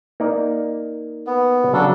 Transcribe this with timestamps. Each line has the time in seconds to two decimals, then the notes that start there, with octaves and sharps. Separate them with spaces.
0.20 A#3 D#4 D5
1.27 B3
1.73 C#3 F#3 D4 A4